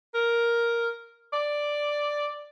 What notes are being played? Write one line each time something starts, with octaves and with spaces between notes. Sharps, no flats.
A#4
D5